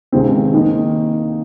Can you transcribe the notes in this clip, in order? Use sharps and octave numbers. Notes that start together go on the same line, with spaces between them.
C#2 C3 D#3 G#3 C4
D#3 A#3 D#4